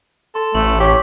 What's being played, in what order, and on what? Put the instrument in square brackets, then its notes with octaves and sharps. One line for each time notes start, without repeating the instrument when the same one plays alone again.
[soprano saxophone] A4 [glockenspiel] C6
[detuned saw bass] A1 [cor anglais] A3 [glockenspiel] F#7
[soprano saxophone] G4 [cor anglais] C#5 [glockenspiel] D6 B6